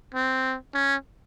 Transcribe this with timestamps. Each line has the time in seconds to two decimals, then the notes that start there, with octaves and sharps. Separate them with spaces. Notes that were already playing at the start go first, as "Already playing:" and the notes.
0.14 C4
0.74 C#4